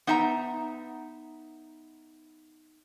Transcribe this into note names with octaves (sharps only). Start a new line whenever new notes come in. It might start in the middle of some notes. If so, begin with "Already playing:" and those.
B3 D#4 E5 A5 A#5